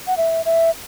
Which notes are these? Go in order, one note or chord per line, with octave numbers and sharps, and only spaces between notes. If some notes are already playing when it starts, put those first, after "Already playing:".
F#5
E5
E5